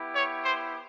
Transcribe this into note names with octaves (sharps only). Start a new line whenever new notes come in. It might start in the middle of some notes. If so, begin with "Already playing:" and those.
Already playing: B3 E4 G4
C#5
C5